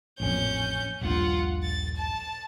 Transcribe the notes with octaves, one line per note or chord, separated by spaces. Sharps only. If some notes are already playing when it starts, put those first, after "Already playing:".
A1 F2 A#2 C#4 G6
D#1 A#1 G2 F4 F#5
A6
A5